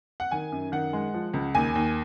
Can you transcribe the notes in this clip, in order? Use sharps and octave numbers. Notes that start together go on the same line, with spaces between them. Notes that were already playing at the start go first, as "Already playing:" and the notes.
F#5
D#3 G#5
F#2
D#3 F#5
G#3
F3
C#2
D#2 G#5
D#2